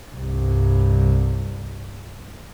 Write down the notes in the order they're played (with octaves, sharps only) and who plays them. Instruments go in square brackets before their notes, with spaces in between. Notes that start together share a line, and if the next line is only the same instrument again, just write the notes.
[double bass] C2 G2